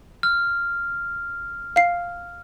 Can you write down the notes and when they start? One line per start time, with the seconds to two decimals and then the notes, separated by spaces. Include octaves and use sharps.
0.23 F6
1.76 F5 C7